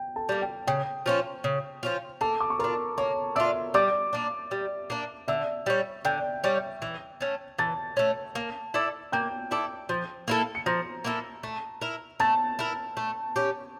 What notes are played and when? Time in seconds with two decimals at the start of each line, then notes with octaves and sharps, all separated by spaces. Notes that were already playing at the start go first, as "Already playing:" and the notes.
Already playing: G5
0.16 A4 A5
0.29 G3 A#3
0.42 G5
0.67 C#3 G5
1.06 F3 C#4 F4
1.44 C#3
1.83 F3 C#4 F4
2.21 A#3 A4 A5
2.41 D6
2.50 C#6
2.59 D4 F4 A#4 A#5
2.98 A#3 C#5 C#6
3.36 D4 F4 E5 E6
3.74 G3 D5 D6
4.13 A#3 D4
4.51 G3
4.90 A#3 D4
5.28 D3 E5 E6
5.66 G3 C#4
6.05 D3 G5 G6
6.44 G3 C#4
6.82 E3
7.21 A3 C#4
7.59 E3 A5 A6
7.97 A3 C#4
8.35 A#3
8.74 E4 A4 D5
9.12 A#3 G5 G6
9.51 E4 A4 D5
9.89 F3
10.28 A#3 E4 A4
10.55 C#7
10.66 F3 A#5 A#6
11.04 A#3 E4 A4
11.43 A3
11.81 E4 A#4
12.20 A3 A5 A6
12.59 E4 A#4
12.97 A3
13.36 C#4 G4